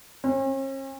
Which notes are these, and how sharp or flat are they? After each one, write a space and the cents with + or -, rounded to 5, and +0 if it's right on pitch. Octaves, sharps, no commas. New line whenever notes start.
C#4 -45